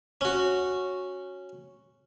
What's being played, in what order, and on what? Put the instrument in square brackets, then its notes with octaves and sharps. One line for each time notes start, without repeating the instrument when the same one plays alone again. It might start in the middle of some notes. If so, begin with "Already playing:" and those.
[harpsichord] C#4 F#4